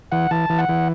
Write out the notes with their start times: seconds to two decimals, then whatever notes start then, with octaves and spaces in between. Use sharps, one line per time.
0.12 E3 F#5
0.31 E3 A5
0.50 E3
0.58 F#5
0.69 E3